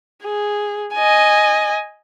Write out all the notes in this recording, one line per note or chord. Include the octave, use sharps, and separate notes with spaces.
G#4
D#5 G#5